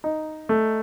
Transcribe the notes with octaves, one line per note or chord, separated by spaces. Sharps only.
D#4
A3